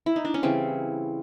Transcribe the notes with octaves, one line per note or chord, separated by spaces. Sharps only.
E4
D#4
D4
C#4
C#3 E3 G3 C4